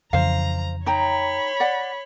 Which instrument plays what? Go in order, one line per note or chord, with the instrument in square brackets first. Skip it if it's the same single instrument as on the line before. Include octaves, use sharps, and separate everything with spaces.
[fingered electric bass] F2 C#3 E3 [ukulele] C5 F5 [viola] A#5
[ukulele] D#4 G5 A#5 [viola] C#5 B5
[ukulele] D5 F#5